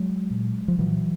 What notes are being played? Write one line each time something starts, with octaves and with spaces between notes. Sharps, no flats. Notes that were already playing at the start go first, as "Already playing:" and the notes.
Already playing: F#3 G#3
A#2
F3
A#2 E3 F#3